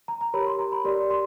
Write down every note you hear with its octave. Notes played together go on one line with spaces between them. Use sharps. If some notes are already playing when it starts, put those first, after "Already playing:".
A#5
A#5
G4 A#4 C#5 B5
C6
A#5
B5
G4 A#4 D5 C6
C6